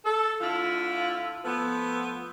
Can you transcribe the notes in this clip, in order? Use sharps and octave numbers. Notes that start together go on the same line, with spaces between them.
A4
D3 A3 E4 F4
F3 A3 B3